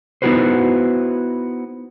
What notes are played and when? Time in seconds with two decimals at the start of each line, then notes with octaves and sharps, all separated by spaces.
0.22 B3 D#4 E4 F#4 B4 C5